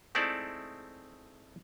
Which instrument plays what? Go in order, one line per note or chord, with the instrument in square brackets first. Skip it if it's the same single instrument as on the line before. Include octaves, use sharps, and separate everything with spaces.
[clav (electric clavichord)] G#3 A3 C4 D#4 E4 D5